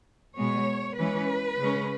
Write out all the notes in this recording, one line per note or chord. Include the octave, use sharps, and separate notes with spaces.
B2 G#3 B3 C#5
E3 G#3 C#4 B4
C#3 G#3 C#4